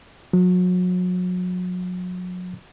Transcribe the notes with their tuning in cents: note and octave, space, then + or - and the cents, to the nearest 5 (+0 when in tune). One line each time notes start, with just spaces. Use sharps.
F#3 -35